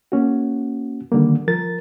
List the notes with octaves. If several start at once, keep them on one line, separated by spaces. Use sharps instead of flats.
A#3 C#4 F#4
D3 D#3 G3 A#3
F3 A#4 A6